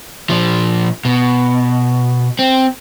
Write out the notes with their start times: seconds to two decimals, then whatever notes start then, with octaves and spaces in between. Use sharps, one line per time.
0.30 A#2 F3
1.05 B2
2.39 C4